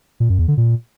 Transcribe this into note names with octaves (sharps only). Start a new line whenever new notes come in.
A#2
F#2
E2
D3
A#2